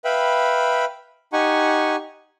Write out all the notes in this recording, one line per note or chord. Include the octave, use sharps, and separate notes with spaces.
B4 E5 F5 G5 B5
D#4 G4 F#5 G#5 C#6